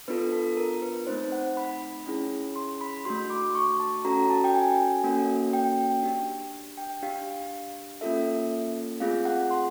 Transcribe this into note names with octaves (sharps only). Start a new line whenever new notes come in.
B3 D4 F4 A4 B4
A4
A#4
B4
A3 C4 D#4 C5
F#5
B5
C#4 E4 G#4
C6
B5
A3 D4 F#4 C6
D6
C#6
A5
C#4 F#4 A4 A#5
A5
G5
G#5
A#3 C#4 F#4 A4
G5
D4 G4
G5
D4 G4 F5
A#3 C#4 F4 A4 E5
A3 C4 F4 G#4 F5
F#5
C6